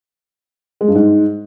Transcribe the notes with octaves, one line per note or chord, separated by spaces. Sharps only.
G#3
G2
G#2